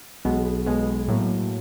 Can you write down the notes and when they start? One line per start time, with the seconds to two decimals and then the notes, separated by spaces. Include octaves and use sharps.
0.25 B1 B2 G#3 B3
0.66 B1 B2 G#3 B3
1.08 A2 F#3 A#3